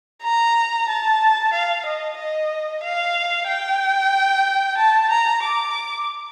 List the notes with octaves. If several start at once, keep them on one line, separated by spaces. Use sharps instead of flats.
A#5
A5
F5
D#5
D#5
F5
G5
A5
A#5
D6